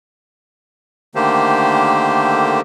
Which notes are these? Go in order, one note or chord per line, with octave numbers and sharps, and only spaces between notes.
D3 D#3 A3 A#3 G4 C5